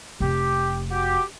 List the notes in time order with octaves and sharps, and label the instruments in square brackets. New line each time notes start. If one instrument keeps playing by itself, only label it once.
[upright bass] F1 [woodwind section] G4
[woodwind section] F#4 G4